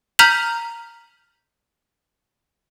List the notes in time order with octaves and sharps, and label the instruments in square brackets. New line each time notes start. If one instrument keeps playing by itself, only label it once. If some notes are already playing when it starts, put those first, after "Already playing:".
[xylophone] A#5 F6 G6 B6 F7 F#7